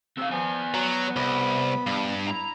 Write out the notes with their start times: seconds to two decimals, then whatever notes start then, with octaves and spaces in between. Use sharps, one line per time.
0.17 C3 F5 E6
0.31 F3 B3 G#5
0.74 F#3 A#5
1.16 C2 B5
1.87 G2
2.27 E4 A#5